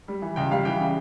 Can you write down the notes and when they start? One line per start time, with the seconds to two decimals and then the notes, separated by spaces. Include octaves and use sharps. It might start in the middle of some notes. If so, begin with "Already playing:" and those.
0.08 G3
0.22 E3
0.36 C#2 G5
0.51 G3 F5
0.65 E3 G5
0.80 C#3